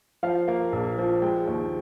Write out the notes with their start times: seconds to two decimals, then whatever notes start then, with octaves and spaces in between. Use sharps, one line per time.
0.23 F3 F5
0.48 A#3
0.72 A#1
0.98 F3
1.22 G#3 G5
1.47 D#2